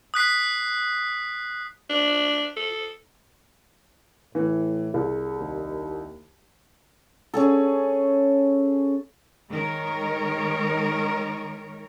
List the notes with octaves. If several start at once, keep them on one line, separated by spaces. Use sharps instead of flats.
D#6 F#6 B6 C7
D4
A4
A2 E3
C2 G#4
D#2
C#4 G#4 A4
D#3 G#3 A#4 C#5